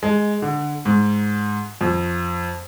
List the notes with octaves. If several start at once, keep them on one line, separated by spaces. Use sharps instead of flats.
G#3
D3
G#2
F2